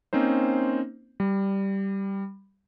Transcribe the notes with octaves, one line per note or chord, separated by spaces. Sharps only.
A#3 C4 C#4 D#4 C5
G3